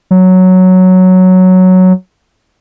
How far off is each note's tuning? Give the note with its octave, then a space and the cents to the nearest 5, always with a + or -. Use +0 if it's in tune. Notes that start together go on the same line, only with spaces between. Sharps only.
F#3 +0